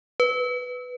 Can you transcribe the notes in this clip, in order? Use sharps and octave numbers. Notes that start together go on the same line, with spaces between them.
B4